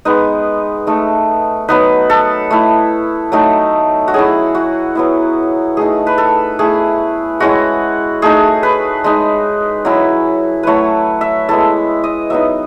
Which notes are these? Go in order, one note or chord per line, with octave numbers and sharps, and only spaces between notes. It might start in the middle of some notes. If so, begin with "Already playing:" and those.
G#3 B3 D#4 B4
A3 D#4
F#3 B3 D#4 B4
A4
A3 E4
F#3 A3 D#4
F#4
F#3 C#4 E4 G#4
F#4
F#3 B3 E4
A3 D#4 G#4
B4
A4
A3 E4 G#4
G#3 C#4 E4 F#4
A3 D#4 G#4
B4
G#3 D#4
F#3 C#4 E4
F#3 A3 E4 B4 C#5
E5
G#3 B3 E4 A4
D#5
F#3 B3 D#4 E5